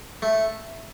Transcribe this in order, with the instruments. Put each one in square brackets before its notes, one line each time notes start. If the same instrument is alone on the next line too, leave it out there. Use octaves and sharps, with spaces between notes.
[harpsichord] A3